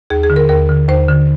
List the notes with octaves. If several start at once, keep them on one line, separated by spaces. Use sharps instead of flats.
D#2 G#4
G#4
D3
A#4
D#2 A#4
D3
D#2 C5
D3